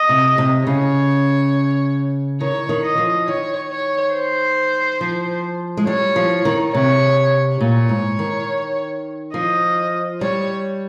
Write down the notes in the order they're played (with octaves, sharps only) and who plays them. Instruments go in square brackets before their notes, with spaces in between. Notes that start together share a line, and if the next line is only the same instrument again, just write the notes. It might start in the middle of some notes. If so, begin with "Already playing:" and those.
Already playing: [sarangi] D#5
[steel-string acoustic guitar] C3
C3
[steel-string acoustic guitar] C#3 [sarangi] C#5
[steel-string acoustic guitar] D#3 [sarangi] C#5
[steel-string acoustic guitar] D#3
[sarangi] D#5
[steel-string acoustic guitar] F3
[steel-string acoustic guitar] D#3 [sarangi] C#5
[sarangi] C#5
C5
[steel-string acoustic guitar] F3
G#3
[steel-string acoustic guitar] G3 [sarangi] C#5
[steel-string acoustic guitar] F3
D#3
[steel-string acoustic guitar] C3 [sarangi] C#5
[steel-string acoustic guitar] A#2 [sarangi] C#5
[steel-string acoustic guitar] G#2
D#3
[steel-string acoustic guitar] F3 [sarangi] D#5
[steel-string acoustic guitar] G3 [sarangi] C#5